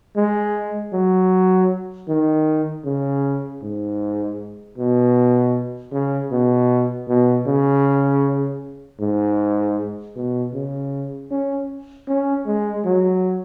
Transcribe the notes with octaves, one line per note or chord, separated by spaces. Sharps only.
G#3
F#3
D#3
C#3
G#2
B2
C#3
B2
B2
C#3
G#2
B2
C#3
C#4
C#4
G#3
F#3